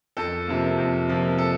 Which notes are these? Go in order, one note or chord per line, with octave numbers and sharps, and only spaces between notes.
F2 A4
C3 F3 A#3
F2
C3 F3 A#3
A4